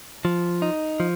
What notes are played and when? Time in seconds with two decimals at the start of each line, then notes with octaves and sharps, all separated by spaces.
0.25 F3
0.62 D#4
1.00 F3